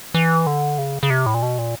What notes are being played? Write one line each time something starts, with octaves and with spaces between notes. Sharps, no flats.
E3
D3
C#3
C#3
C3
A2
A#2
B2
A#2